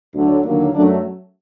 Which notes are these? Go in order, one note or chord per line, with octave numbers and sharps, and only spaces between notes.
D2 D3 F#3
D#2 D3 F#3 A#3
F#2 F#3 A3 D4